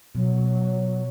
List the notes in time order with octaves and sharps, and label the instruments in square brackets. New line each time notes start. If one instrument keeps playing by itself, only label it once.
[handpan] B2 [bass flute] F#3